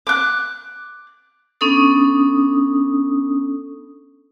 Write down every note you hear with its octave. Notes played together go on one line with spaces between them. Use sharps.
D6 F#6
B3 C#4 D4 A4 D#6